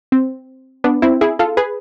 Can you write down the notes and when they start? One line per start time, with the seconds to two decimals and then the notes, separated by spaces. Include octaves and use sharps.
0.12 C4
0.84 B3 D4
1.02 C4 E4
1.21 E4 G#4
1.39 F4 A4
1.57 G#4 B4